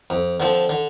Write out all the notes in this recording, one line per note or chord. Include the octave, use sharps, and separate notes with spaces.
F2
D3 F3 C4
D3